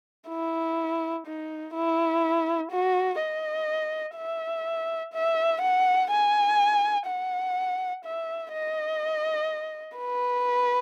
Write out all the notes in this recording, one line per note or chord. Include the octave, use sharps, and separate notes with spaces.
E4
D#4
E4
F#4
D#5
E5
E5
F#5
G#5
F#5
E5
D#5
B4